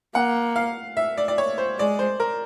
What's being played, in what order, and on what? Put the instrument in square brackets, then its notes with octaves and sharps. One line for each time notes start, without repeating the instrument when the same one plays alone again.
[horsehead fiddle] A#3 [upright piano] F#5
[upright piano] F5
E5
D5
D5
C#5
C5
[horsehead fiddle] G#3 [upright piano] D5
[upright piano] C5
A#4